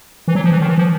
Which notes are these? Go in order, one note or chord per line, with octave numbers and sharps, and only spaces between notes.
E3
F#3
F3
E3
D#3
E3
F3